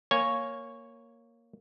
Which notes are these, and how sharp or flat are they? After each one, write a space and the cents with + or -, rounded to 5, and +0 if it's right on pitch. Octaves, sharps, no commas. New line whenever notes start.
A#3 +0 C#5 +0 G#5 +0